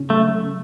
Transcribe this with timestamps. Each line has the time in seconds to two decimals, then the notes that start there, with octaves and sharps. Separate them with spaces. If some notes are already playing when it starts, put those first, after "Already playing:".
Already playing: C#3 C#4
0.09 F#3 A3